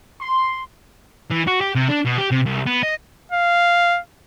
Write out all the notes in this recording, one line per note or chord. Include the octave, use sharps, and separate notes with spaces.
C6
E3
F#4
G4
C3
D4
B2
G4
C3
C2
B3
D#5
F5